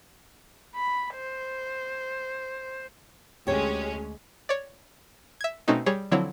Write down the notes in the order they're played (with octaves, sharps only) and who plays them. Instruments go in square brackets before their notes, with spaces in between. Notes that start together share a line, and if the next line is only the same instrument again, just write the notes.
[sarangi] B5
C5
[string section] D2 G#3 C#4 [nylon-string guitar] G4 C#5
[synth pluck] C#5 D5
E5 G#6
B2 A3 C4 C#4 D#4 F#4
G3 G#4 C#5
D3 F3 F#3 C4 E4 C#5